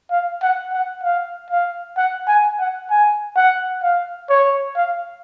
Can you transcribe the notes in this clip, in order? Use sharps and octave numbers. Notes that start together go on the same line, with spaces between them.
F5
F#5
F#5
F5
F5
F#5
G#5
F#5
G#5
F#5
F5
C#5
F5